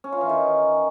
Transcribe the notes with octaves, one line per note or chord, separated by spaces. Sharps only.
C#4
F4
E3
D#3